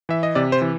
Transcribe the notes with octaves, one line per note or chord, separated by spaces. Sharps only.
E3 E5
D#5
C3 D5
C5
E3